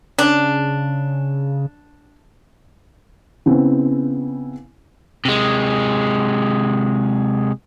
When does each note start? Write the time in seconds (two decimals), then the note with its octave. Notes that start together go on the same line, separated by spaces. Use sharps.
0.18 C#3 D4
3.46 C#3 B3 C4 E4
5.25 C3 G#3